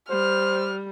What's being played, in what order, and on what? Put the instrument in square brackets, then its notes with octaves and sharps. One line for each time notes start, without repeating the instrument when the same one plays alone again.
[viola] G3 [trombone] C5 [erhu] F6